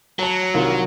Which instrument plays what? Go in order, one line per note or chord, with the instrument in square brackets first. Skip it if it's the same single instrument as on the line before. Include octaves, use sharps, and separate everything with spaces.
[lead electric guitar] F#3 [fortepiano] C#5 A5
[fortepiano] C2 D#3 F4